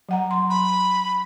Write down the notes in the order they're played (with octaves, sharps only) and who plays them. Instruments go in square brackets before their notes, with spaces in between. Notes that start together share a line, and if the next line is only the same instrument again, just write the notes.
[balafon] F#3 F#5 A#5
C6
[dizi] B5